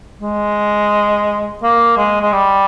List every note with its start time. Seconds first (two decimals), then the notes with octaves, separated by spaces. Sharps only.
0.21 G#3
1.63 A#3
1.97 G#3
2.22 G#3
2.33 G3